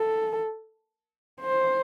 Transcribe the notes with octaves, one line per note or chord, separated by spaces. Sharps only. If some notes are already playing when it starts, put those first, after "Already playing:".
Already playing: A4
C5